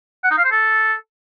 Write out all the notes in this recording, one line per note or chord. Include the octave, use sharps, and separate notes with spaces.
F#5
D#4
F5
C5
A4